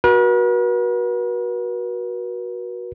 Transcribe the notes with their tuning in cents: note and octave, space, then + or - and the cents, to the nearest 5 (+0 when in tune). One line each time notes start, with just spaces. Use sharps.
F#4 +0 B4 -45